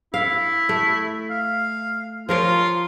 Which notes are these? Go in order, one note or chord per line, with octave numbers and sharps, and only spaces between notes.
E4 F5
A3
F5
F3 F4 A#4 C#5